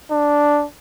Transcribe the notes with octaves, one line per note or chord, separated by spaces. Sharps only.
D4